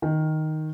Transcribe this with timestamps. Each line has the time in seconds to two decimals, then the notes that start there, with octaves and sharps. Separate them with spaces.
0.02 D#3